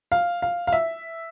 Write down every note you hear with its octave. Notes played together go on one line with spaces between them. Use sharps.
F5
F5
F5
E5